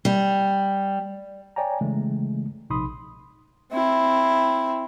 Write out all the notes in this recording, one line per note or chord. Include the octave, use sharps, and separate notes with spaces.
G3
C#5 D5 G5 G#5 A#5
C#3 E3 G#3 A3
A#1 C3 D#4 B5 C6 D#6
C4 E4